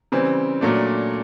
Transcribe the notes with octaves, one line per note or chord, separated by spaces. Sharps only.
C#3 E3 G3 C4
A#2 F#3 A3 D4